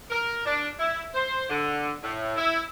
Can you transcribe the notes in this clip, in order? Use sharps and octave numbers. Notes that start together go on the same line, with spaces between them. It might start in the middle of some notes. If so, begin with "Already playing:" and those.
A#4
D4
E4
C5
D3
A2
E4